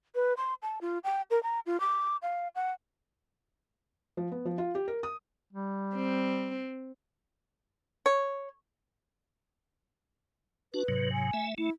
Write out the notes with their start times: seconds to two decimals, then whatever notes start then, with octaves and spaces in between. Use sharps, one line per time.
0.15 B4
0.37 C6
0.62 A5
0.81 F4
1.04 G5
1.31 A#4
1.43 A#5
1.66 F4
1.80 D6
2.22 F5
2.55 F#5
4.17 F3
4.32 B3
4.45 F3
4.58 F4
4.75 G4
4.88 A#4
5.03 D#6
5.53 G3
5.95 C4
8.06 C#5
10.74 D4 F#4 B4
10.88 G#2 C3 F#3
11.13 G#5
11.33 A3 E5
11.58 A3 E4